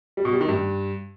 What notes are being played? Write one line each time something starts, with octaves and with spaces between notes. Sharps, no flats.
G3
B2
G3
D#3
G2